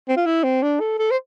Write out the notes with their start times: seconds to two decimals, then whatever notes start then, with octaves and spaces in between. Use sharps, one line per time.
0.08 C4
0.17 F4
0.26 E4
0.44 C4
0.63 D4
0.80 A4
0.99 A4
1.11 C5